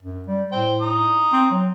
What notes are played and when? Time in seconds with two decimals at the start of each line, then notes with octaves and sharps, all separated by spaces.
0.03 F#2
0.28 G3
0.52 A2 C5 G5
0.81 A#5 D#6
1.33 C4
1.51 F#3